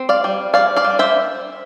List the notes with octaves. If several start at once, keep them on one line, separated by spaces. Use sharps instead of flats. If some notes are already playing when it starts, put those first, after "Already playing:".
Already playing: C4
D5 F5
G3
G3 D5 F5
D5 F5
G3
C5 E5